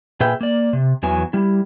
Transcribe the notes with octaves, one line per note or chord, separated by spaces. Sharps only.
A#2 G#4 B4 E5 G5
A#3 D5
C3
E2 E3 F#3 B3 G#5
G3 E4